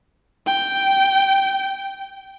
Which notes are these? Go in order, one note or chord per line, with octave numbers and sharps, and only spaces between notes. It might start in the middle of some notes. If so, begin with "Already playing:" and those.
G5